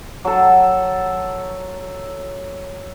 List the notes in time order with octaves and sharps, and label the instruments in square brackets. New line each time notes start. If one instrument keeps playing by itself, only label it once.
[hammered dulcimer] F#3 A4